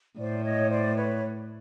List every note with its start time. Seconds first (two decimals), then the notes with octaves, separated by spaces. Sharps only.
0.18 A2 C5 D5
0.44 C#5 D#5
0.69 C5 D5
0.96 B4 C#5